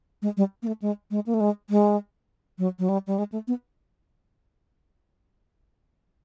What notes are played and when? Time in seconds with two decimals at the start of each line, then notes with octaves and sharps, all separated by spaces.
0.22 G#3
0.37 G3
0.63 A#3
0.67 A3
0.82 G#3
1.11 G#3
1.26 A#3
1.34 A3
1.40 G#3
1.70 G#3
2.59 F#3
2.79 F#3
2.89 G3
3.07 G3
3.18 G#3
3.32 A3
3.48 B3